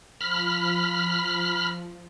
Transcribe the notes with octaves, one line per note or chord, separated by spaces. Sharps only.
F3 B5 F6